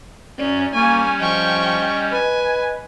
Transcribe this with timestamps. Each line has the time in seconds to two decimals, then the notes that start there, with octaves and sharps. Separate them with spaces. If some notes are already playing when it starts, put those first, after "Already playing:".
0.39 F#2 C#4 D5
0.75 G3 A#3 C#4 G#5 C#6
1.20 F3 D#5 G5 C#6
2.13 B4 G#5